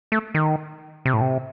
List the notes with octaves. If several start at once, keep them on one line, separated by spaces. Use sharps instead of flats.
A3
D#3
C3
A2
C3